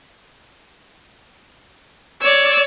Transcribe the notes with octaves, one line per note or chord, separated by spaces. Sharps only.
C#5 D5 E6